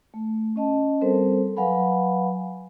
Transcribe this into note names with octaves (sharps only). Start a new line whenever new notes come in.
A3
C#4 D#5 A5
G3 C4 A4 A#4 C5
F#3 B4 F5 F#5 G#5 B5